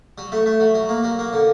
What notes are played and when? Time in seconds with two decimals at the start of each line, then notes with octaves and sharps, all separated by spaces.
0.18 F#3
0.32 A3
0.46 A3
0.60 F#3
0.75 F#3
0.89 A#3
1.03 F#3
1.19 A#3
1.33 D3